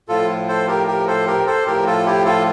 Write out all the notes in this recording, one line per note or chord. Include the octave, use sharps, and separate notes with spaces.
A2 F3 F4 A4
A4 C5
G4 A#4
G4 A#4
A4 C5
G4 A#4
A4 C5
A2 F3 G4 A#4
F4 A4
E4 G4
F4 A4